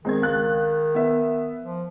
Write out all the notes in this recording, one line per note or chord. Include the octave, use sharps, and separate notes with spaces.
D#3 G#3 C4 G#6
C#2 F#6 A6
B3 E5
F3